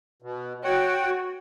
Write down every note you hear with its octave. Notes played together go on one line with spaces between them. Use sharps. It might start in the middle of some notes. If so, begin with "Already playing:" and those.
B2
F#4 C#5 F#5 G5